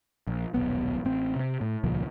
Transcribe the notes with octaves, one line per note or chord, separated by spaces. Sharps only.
A#1
D#1 B1 B3
A1 C4
C3 C4
A2
D#1 C#2 A#2 F3